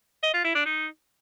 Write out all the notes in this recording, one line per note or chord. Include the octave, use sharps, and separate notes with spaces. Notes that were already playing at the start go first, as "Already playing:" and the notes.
D#5
F4
E4
D4
D#4